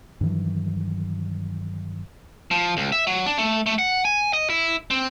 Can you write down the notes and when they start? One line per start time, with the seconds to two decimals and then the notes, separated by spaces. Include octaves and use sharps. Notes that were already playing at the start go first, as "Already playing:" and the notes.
0.21 G2 D#3 E3 F#3
2.51 F3
2.77 C#2
2.92 E5
3.07 F#3
3.26 D4
3.38 A3
3.66 A3
3.79 F#5
4.05 G#5
4.33 D#5
4.50 E4
4.91 C4